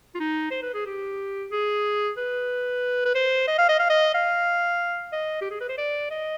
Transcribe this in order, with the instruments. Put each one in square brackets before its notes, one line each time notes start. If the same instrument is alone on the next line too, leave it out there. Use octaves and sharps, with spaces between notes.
[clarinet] F4
D#4
C5
B4
G#4
G4
G#4
B4
B4
C5
D#5
F5
D#5
F5
D#5
F5
D#5
G4
G#4
B4
C5
D5
D#5